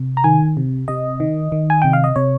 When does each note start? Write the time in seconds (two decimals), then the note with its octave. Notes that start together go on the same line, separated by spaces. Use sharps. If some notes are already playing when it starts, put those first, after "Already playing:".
Already playing: C3
0.17 A#5
0.24 D#3 G#5
0.57 C3
0.88 C3 D#5
1.20 D#3
1.52 D#3
1.70 G#5
1.82 C3 G5
1.93 F5
2.04 D#5
2.16 C3 C#5